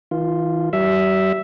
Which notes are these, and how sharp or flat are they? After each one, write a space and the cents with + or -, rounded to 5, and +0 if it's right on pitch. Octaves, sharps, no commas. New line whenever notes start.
E3 -45 F4 +0
G3 -45 E5 +0